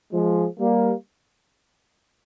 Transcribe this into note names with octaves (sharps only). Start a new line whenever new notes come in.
F3 G#3
G3 A#3